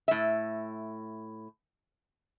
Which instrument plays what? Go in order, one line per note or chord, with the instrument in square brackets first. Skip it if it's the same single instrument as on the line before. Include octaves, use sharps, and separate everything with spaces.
[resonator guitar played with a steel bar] A2 E5